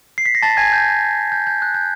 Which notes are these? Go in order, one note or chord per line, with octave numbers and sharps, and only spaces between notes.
C7
B6
A#6
A5 A6
G#5 G#6
G6
G6
G6
F#6
G6